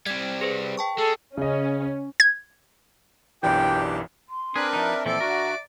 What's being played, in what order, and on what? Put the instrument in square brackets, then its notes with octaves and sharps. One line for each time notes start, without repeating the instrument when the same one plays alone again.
[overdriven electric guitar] G3 C4 [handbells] G#6
[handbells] G#4 B4 C5
G5 A5 C#6
[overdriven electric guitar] G#3 [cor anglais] A4
[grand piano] C#3 D#5 [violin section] C#4
[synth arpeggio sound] G#6
[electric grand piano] B1 F#2 E3 [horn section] D4 G4 [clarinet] G5
[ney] C6
[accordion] C4 D4 A#4 [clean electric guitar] G#4 [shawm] B4
[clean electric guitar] F3 D#4 [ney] E5
[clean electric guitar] A#2 E3 F3 [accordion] C4 A4 [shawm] D5
[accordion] D3 F#4 [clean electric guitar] A#4